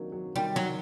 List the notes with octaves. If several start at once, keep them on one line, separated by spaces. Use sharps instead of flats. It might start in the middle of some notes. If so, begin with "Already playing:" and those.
Already playing: D#3 F#3 A#3 C4 D4
F#3
D#3 G3
F#3